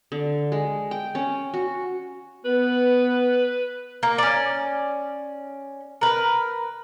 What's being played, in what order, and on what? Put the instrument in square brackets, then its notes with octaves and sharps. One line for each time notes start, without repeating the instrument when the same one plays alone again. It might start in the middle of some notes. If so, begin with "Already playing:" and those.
[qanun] D3
G#3
G5
C#4
F#4
[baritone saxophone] B3 [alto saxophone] B4
[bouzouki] A#3
C#4 D5
A#4 B4